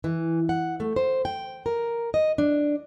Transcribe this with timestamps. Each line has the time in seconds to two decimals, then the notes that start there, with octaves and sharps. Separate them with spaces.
0.04 E3
0.49 F#5
0.80 A3
0.96 C5
1.25 G5
1.66 A#4
2.14 D#5
2.38 D4